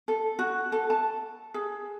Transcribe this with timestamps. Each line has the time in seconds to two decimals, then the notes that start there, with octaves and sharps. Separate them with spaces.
0.08 A4
0.39 F#4
0.72 A4
0.90 A5
1.54 G#4